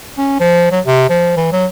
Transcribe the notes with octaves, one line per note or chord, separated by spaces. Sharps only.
C#4
F3
F#3
C3
F3
E3
F#3